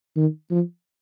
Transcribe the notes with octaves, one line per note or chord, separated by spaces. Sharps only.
D#3
F3